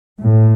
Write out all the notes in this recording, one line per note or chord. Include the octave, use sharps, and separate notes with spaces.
A2